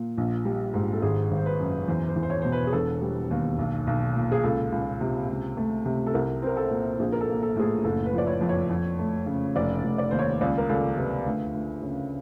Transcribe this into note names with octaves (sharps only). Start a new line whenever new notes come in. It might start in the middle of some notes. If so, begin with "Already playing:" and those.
Already playing: A#2
A#1
G3
G#2
A4
G#1 G#4
G#1
C5
B4
F#2
E2 C5
C5
E2
C5
C#5
B2 C5
B4
G#4
E1 A4
G3
D#2
B1
B1
A#2
G#4
C#2 A4
C#2
C3
C#2
A3
C3
A4
C2 A#4
C4 A#4
A4
A#2
A#1 G#4
A#4
A4
A#3
A4
A2 G#4
A4
F#1 A4
B4
F3 D5
C#5
F2
C#5
F2
A3
C#3
F1 D5
F1
D5
D#2 C5
C#5
C#2 D5
A#4
C#2 A4
C3 B4
D2
D2
C#3